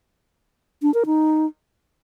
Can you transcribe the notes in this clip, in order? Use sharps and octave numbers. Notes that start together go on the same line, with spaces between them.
D4
A#4
D#4